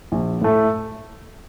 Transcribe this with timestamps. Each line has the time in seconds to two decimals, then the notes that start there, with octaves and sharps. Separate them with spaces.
0.12 A#1
0.41 A2 A3